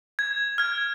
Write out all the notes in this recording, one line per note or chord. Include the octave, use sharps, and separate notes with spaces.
G#6
F6 G#6